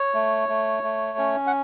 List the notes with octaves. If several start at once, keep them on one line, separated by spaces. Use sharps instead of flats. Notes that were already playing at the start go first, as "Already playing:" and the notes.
Already playing: C#5
A3
A3
A3
C#4
F#5